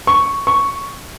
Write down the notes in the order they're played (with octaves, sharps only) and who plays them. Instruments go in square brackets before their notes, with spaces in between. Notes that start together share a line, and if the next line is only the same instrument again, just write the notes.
[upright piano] C#6
C#6